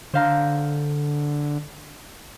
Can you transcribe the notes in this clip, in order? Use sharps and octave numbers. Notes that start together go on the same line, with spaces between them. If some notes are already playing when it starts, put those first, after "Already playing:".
D3 C5 F5 A#5